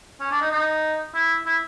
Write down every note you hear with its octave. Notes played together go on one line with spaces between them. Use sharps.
C#4
D4
D#4
D#4
E4
E4